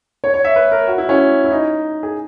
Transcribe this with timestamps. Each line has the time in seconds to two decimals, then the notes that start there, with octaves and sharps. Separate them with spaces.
0.24 C#5
0.34 C#5
0.45 E5
0.56 B4
0.72 A#4
0.87 F#4
0.98 E4
1.09 C#4
1.44 E4
1.51 D#4
2.03 G#4